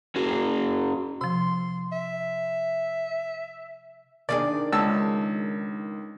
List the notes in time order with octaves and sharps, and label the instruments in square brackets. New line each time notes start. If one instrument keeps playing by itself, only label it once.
[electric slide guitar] C#4 F#4 G#4
[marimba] C3 F3 [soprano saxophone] C6
[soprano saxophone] E5
[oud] D#3 D4 G#4 [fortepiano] D5
[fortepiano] C#2 A5 E6